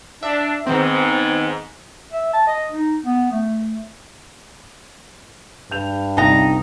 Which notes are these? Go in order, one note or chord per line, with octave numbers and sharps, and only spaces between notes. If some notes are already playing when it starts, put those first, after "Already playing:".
D4 E5
G#2 D#3 B3 C4
E5
A5
D#5
D#4
B3
A3
G2 G6 F7
G1 C2 D#4 G5 A#5